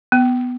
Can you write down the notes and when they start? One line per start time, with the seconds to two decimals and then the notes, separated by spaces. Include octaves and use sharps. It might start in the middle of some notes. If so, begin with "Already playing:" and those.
0.12 B3